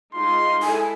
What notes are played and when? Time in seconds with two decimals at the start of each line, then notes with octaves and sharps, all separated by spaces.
0.14 G#3 D#4 F4 C6
0.63 E4 A4 G#5